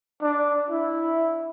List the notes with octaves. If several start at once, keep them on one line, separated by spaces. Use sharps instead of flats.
D4
E4